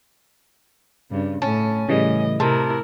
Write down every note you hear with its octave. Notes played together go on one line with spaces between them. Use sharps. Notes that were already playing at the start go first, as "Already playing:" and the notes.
G2 C#3
A2 C#4 A5
A2 C#3 E3 G3 D#5
C3 E4 A#4 A5